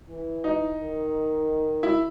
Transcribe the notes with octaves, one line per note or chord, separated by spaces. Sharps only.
E3
D#4
D#3
E4